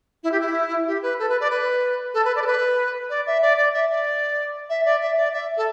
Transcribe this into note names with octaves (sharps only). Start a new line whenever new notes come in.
E4
G4
E4
G4
B4
A4
B4
D5
B4
A4
B4
D5
A4
B4
D5
E5
D5
D5
E5
D5
E5
D5
E5
D5
E5
A4